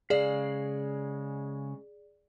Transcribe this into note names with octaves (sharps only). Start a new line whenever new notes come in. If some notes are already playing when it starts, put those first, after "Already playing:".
C#3 G#3 G#4 D5 F5